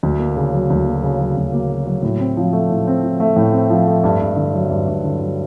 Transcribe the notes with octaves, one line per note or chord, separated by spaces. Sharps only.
D2
A#3
C#3
F#3
D2
A#3
C#3
F#3
D2
A#3
C#3
F#3
A2
C4
F3
A3
A2
C4
F3
A3
A2
C4
F3
A3
G2
G2
D3
F#3
G2
G2
D3
F#3